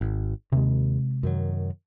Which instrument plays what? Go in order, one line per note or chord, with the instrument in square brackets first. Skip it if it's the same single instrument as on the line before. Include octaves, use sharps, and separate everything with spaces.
[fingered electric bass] G#1
[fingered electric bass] D#2 [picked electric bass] C3 G#3
[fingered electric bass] F#2 D#3 F#3